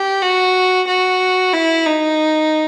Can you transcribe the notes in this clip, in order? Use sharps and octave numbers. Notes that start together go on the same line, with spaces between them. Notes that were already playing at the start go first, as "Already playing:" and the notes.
Already playing: G4
F#4
F#4
E4
D#4